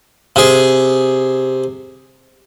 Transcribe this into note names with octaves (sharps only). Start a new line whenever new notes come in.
C3 G#4